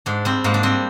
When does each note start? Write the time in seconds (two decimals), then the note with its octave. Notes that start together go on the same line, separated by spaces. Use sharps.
0.06 G#2 D4
0.25 G3 C4
0.44 G#2 A#3
0.54 D4
0.63 G3 C4